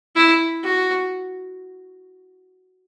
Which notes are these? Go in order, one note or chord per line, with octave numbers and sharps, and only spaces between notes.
E4
F#4